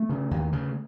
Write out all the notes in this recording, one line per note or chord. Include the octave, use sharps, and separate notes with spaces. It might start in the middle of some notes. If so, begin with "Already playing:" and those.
Already playing: A3
C#3
D#2
C#3